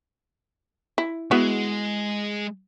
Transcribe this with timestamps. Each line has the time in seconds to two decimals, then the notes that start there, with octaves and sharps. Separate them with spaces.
0.98 E4
1.31 G#3 B3 E4 F#4